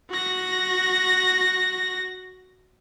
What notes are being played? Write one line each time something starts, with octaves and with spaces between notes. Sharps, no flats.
F#4 A#6